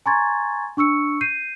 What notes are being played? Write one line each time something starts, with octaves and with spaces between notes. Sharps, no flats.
G#5 A#5 C6 C#6 G#6 A6
D4 C#6 E6 C#7
G6 C7 D#7